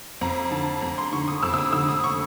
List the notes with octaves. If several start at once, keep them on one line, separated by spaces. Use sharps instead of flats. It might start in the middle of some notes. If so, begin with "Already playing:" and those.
F2 A#5
D3 A5
F2 A#5
C6
D3 C#6
D#6
F2 E6
E6
D#6
D3 E6
D#6
C#6